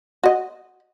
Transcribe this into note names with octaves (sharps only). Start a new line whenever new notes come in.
F#4 D#5